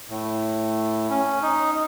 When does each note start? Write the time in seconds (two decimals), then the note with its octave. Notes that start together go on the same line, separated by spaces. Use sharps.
0.09 A2
1.10 C#4
1.42 D#4